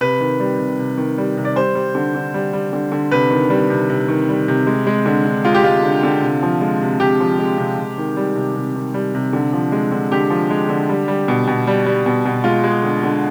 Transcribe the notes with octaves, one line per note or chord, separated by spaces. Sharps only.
C3 B4
D#3
G3
C3
C3
D#3
G3
C3
D5
G3 C5
G3
D3
D3
G3
G3
D3
D3
C3 B4
D#3
G3
C3
C3
D#3
G3
C3
G#3
G#3
D3
D3
G#3 F4
G4
G#3 F4
D3
D3
C3
F3
G#3
C3
C3 G4
F3
G#3
C3
C3
D#3
G3
C3
C3
D#3
G3
C3
D3
F3
G#3
D3
D3 G4
F3
G#3
D3
G3
G3
B2
B2
G3
G3
B2
B2
G#3 F4
G#3
D3
D3